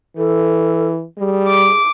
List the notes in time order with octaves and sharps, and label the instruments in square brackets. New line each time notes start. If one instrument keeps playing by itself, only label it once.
[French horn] E3 [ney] A4
[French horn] G3 [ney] G#4
[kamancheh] D6